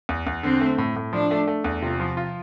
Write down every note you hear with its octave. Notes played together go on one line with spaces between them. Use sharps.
E2
E2
D3 C4
A3
A2
A2
F3 D4
A3
A3
E2
C3 F4
F3
F4